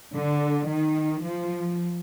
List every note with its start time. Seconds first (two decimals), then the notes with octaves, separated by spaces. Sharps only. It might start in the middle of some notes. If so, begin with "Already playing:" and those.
0.14 D3
0.68 D#3
1.22 F3